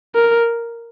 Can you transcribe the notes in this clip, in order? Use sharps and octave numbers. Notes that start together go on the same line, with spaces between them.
A#4